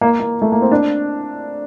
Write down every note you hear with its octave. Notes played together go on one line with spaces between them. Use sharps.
A#3
A#3
A3
A#3
C4
D4